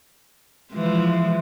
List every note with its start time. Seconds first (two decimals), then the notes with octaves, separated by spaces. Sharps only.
0.72 E3 F3 G#3